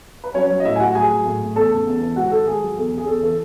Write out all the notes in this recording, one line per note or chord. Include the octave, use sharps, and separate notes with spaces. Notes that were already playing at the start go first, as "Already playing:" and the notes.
B4
F#3 C#4 C#5
F#3
D#5
A2 E4 E5
G#5
A2 F#4 F#5
F#3 G#4 G#5
F#3
A2
A2
E2 A4 A5
C#3
E2
E3
G#2 F#4 F#5
D#3 A4
G#2 G#4
F#3
E2 A4
C#3 G#4
E2 A4
E3 A4